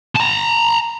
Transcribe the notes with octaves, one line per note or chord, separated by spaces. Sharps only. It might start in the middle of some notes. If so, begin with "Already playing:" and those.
A5 A#5